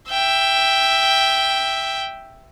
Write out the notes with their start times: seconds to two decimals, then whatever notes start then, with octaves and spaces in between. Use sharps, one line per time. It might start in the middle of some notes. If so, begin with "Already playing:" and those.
0.10 E5 G5